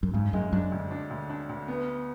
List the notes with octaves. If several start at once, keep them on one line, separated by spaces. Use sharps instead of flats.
F#2
G#2 C#3
F#2 G#3
F#2 D4
D2
D4
D2
D4
D2
B3